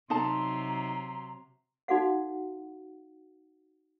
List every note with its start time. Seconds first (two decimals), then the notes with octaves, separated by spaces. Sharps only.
0.10 C3 F#3 D#4 A5 A#5 C6
1.88 D#4 F#4 A4 F5 F#5